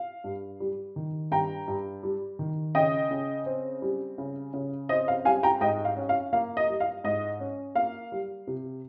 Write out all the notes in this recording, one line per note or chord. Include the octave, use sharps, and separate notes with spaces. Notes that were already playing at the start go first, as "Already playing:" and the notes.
Already playing: F5
G2
G3
D#3
G2 G5 A#5
G2
G3
D#3
C#3 D#5 G5
C#3
C4
G3
C#3
C#3
C4 D#5
F5
G3 F5 G#5
G5 A#5
G#2 D#5 G5
F5
C#4
F5
A#3 F5
D#5
G3
F5
G#2 D#5
C#4
A#3 F5
G3
C3